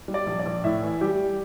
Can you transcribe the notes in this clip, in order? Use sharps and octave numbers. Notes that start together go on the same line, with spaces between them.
G3
D5
A#1
D5
A#1
A2 E4 E5
E3
G3 G4 G5